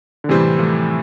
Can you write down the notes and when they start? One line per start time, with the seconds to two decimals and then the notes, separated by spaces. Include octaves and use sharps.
0.24 D3
0.29 A2 C3 E3 G3 C4
0.58 F3 A3